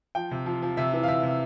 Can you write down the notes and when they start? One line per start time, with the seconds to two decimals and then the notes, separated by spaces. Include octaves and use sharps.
0.15 F3 G5
0.31 C3
0.46 F3
0.63 F3
0.77 C3 E5
0.93 E3
1.03 F5
1.08 C3 E5
1.23 C3